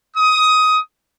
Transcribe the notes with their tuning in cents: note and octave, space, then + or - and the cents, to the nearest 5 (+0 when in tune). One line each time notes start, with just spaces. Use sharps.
D#6 +15